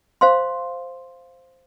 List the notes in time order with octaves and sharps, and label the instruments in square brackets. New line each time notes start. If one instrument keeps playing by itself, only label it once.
[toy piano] C5 F5 C6